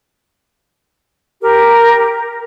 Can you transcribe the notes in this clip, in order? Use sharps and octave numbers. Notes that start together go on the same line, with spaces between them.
G4 A#4